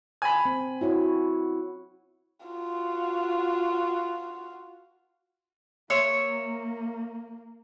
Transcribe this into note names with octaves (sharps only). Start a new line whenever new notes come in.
G#5 B5
C4
E4 F#4 C#5
F4 F#4
A#3 C#5 E5 C6